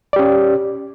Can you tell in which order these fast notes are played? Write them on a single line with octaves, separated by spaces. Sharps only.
D5 G4 C#4